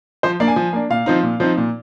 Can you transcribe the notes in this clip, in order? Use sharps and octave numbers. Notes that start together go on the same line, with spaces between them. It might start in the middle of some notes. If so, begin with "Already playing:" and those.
F3 C5
A#3 D4 D5
G#5
F3
A#3 D4
A#2 F5
F3 C4 D#4
A#2
F3 C4 D#4
A#2